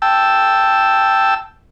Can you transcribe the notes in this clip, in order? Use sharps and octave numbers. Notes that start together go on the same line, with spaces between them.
G5 A5 E6